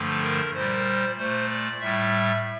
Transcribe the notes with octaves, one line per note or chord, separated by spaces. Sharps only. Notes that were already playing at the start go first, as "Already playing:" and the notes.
Already playing: G2 D3 F3 A3
A#4
A#2 G3 C5
A#2 A3 C5
D5
A2 G3 E5